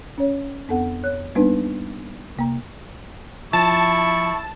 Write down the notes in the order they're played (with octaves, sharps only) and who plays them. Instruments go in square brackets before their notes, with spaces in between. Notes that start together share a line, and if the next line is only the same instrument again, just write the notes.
[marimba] C#4 C#5
F2 B3 C4 A4 F#5
C#5 F#6
G3 A#3 B3 D4 D#4 B4
C3 A#3 A#5
[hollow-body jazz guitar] F3 [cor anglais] E4 [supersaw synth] A5 [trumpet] C#6